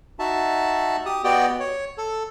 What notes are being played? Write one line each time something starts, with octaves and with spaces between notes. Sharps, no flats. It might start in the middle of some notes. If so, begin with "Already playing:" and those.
D#4 F#4 E5 A5
G4 D#6
B3 F#4 G4 D5 D#5 G5
C#5
A4